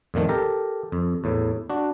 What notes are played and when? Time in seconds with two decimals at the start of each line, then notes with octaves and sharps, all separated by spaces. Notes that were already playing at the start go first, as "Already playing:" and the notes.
0.14 F2 A#2 D#3 A3
0.29 G4 A4 A#4 A#5
0.92 F2
1.24 E2 A2
1.70 D4 F#4